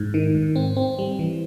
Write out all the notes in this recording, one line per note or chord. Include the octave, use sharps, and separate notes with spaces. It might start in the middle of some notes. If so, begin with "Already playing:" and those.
Already playing: G#2
D#3
G#2
C4
C4
G3
E3